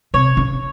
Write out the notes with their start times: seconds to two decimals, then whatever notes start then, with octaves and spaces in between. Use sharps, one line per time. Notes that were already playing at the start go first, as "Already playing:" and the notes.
0.14 C3 C#5
0.37 C#3